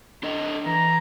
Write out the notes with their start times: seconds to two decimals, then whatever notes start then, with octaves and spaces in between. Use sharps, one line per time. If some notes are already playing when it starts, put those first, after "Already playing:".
0.23 D4 A4 D#5
0.66 E3 A#5